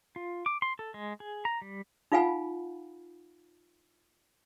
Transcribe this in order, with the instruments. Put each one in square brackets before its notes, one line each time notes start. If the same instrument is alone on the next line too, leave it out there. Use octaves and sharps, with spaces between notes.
[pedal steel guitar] F4
D6
C6
A4
G#3
G#4
A#5
G3
[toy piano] D#4 F4 F5 F#5 G#5 B5